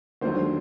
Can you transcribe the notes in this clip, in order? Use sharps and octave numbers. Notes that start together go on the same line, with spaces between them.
D#2 D3 F#3 C5